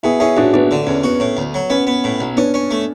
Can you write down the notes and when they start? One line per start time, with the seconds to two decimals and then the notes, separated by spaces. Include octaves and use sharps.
0.03 B2 E4 G#4
0.20 C#4 E4 G#4
0.37 A1 D4 F#4
0.53 A1 B3 D4
0.71 D3
0.87 E2 C#4
1.04 B3 F#4
1.20 A2
1.37 D2
1.54 F#3
1.70 B3 C#4
1.87 B3
2.04 A2
2.21 B1
2.37 B3 C#4 D4
2.54 C#4
2.71 A3